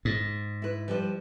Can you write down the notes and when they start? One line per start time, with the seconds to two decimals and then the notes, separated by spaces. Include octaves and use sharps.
0.05 G#2
0.62 E4 B4
0.88 F3 G3 B4